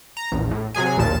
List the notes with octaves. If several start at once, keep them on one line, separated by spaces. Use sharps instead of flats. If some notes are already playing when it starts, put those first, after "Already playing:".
A#5
A#1 E2
A2
C3 F#3 G#4 G#5
A#1 D#2 A#2 A5 E7